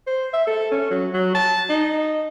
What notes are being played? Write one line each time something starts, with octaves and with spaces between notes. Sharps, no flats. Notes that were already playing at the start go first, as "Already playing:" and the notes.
C5
E5
A4
C#4
F#3
F#3
A5
D#4